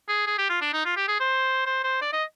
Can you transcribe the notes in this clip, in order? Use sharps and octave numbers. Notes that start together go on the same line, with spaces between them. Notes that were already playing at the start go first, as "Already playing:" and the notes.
G#4
G#4
G4
F4
D4
D#4
F4
G4
G#4
C5
C5
C5
D5
D#5